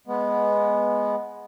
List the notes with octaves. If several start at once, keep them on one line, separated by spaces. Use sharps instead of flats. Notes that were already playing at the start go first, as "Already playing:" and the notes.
G#3 B3